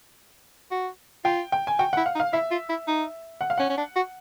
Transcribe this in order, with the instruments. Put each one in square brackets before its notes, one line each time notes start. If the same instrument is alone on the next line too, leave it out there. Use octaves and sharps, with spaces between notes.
[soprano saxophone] F#4
[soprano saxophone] F4 [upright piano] G5
[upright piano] G5
G#5
[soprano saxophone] F#4 [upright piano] G5
[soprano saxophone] E4 [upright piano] F#5
[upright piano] F5
[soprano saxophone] D#4
[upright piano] F5
[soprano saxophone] E4 [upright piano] E5
[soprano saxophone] F4
E4
D#4
[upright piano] F#5
F5
[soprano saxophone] C#4 [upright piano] F#5
[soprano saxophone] C#4
D4
F#4